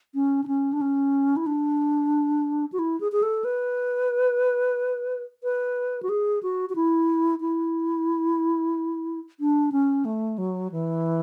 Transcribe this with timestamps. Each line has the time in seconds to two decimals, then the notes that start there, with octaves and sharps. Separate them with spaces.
0.15 C#4
0.44 D4
0.48 C#4
0.73 D4
0.81 C#4
1.37 E4
1.46 D4
2.72 F#4
2.79 E4
3.01 G#4
3.12 G#4
3.23 A4
3.45 B4
5.43 B4
6.03 F#4
6.09 G#4
6.43 F#4
6.70 F#4
6.76 E4
7.41 E4
9.40 D4
9.72 C#4
10.05 A3
10.38 F#3
10.72 E3